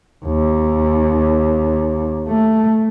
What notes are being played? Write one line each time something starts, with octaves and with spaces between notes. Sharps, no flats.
D#2
A3